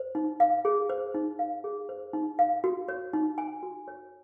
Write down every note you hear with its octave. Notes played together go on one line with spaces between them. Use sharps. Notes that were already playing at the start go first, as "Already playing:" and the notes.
Already playing: C5
D#4
F5
G#4
C5
D#4
F5
G#4
C5
D#4
F5
F#4
C#5
D#4
G#5
F#4
C#5